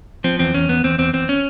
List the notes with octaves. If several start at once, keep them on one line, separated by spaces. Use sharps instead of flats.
F3 C4
E2 C4
E2 C#4
E2 B3
E2 C4
E2 C4
E2 C4
C#4